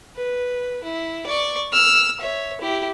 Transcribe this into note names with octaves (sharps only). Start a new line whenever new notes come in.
B4
E4
D5 C#6
E6 F6
C#5 E5
E4 G4